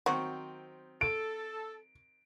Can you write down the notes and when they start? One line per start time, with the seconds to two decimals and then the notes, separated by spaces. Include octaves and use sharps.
0.06 D#3 F#3 C4 F#4
1.01 A4 D7